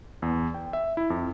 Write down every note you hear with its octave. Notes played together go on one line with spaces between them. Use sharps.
E2
G5
E5
E4
F2